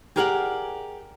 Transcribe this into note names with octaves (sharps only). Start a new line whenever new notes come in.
G4 G#4 A#4 D5 F5 F#5